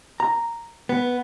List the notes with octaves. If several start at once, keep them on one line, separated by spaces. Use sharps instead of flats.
A#5
B3